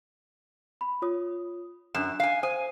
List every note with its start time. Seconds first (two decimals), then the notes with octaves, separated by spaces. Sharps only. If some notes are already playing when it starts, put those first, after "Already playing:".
0.81 B5
1.02 F4 C#5 D#6
1.95 F#2 D4 F#6 E7
2.20 F5 G#5
2.43 C5 G#5 D#6 D#7